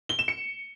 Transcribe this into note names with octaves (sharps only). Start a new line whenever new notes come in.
G7
E7
C#7